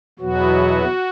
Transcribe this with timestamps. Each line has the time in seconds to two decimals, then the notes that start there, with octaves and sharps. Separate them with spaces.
0.19 E2 B2 F#3 B3 F#4